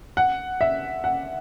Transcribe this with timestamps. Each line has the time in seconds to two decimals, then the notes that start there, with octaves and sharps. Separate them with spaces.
0.17 F#5
0.61 E5
1.04 F#5